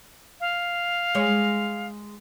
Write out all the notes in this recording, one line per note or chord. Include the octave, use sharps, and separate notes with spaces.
F5
G#3 C#5